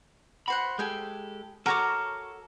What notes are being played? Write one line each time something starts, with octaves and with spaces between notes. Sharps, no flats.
F#4 C5 F#5 B5
G#3 G4 A4 G5 G#5
F#4 A4 A#4 C#5 A#5 D6